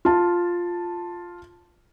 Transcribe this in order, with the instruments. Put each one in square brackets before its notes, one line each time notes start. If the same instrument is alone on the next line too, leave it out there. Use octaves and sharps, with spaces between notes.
[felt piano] F4 A5